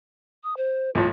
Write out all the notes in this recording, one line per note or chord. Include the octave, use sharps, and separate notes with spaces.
D#6
C5
B1 A2 F4